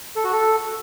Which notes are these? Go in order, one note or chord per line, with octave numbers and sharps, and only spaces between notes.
A4
F#4
A4